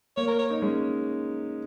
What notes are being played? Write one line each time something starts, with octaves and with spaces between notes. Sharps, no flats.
A#3 C#5
A#4
C#5
D#4
G#3 C#4